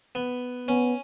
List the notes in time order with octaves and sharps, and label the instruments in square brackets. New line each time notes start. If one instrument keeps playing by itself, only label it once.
[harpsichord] B3
[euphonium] B3 [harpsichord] C#4